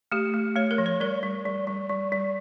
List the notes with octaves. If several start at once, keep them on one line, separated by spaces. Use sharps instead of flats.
A3 G4
A3
A3 C#5
A#4
F3
C#5
G3 A#4
G3
G3
G3
G3
G3